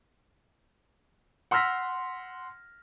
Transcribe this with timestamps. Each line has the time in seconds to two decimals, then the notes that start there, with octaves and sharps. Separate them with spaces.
1.51 F#5 C6 E6 F6 A#6 B6